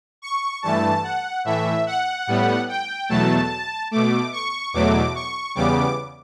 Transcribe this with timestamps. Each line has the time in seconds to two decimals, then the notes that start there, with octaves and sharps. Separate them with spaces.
0.22 C#6
0.62 G2 E3 A3 A5
1.03 F#5
1.44 A2 E3 A3 E5
1.86 F#5
2.27 A2 G3 B3
2.69 G5
3.09 E2 B2 F#3 A3 A5
3.91 B2 A3 D6
4.32 C#6
4.73 E2 B2 F#3 A3 D6
5.15 C#6
5.55 E2 C#3 G3 B3 D6